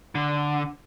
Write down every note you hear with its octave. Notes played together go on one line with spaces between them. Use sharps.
D3